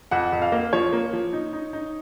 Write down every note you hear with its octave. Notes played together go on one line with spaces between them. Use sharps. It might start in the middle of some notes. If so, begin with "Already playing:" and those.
F2 F#5
F2
F5
A#3
F3 C#5
A#3
F3
D#4
D#4
D#4